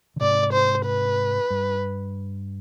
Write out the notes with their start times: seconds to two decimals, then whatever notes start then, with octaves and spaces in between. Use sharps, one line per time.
0.16 D3
0.20 G#2 C3 D5
0.53 C5
0.86 B4
1.50 G2